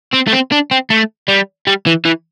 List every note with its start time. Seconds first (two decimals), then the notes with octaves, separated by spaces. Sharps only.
0.14 C4
0.28 A3
0.33 C4
0.52 D4
0.71 C4
0.90 A3
1.28 G3
1.67 G3
1.86 E3
2.05 E3